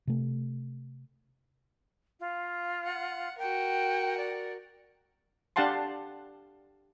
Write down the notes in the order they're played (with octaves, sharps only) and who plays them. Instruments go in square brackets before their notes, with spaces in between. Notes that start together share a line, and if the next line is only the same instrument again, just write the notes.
[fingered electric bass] C3 A3
[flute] F4
[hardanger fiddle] F#5
[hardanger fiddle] F#4 A#4 [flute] G5
[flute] D5
[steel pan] D4 G4 F5 F#5 A5 C6